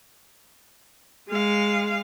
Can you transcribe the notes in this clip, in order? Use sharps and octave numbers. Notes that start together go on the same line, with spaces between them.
G#3 F5